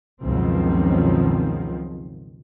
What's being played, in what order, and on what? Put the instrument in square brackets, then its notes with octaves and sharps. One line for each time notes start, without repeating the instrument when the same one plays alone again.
[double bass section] C#2 F#2 B2 D#3 F3 C4